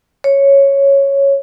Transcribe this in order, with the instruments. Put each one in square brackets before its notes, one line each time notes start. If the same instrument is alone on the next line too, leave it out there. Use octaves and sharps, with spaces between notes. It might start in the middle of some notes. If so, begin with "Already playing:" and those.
[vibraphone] C#5